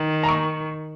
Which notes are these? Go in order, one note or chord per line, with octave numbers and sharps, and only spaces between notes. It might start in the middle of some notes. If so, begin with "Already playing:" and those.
Already playing: D#3
A#5
C#6